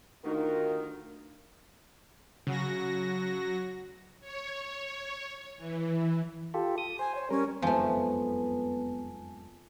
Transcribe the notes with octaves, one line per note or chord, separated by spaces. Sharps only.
D2 D#3 D#4 F4 F#4 A#4
C#3 F#3 F#4 A#6
C#5
E3
F4 G4 A4
D#6
C5 G#5
C#5
G3 C#4 A#4
F#1 F2 G#2 F3 A3 B3 G#5 A5